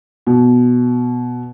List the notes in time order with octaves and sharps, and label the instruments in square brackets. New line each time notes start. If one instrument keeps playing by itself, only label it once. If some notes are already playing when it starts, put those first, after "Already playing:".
[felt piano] B2